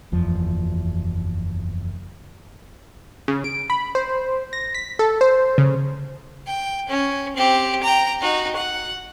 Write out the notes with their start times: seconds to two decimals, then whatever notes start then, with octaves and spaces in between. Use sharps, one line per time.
0.12 F#1 E2 F3
3.28 C#3
3.44 D7
3.70 B5
3.95 C5
4.53 A#6
4.74 B6
4.99 A4
5.21 C5
5.58 C#3
6.47 G5
6.89 C#4
7.36 C4 G4
7.83 G5 A#5
8.21 D#4 F#4
8.56 F#5